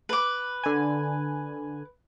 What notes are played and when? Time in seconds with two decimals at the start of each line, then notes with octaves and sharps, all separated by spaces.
0.09 B4 D6
0.64 D3 G#5